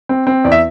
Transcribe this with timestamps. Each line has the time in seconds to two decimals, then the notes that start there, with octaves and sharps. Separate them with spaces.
0.09 C4
0.27 C4
0.45 E2 D5
0.52 E5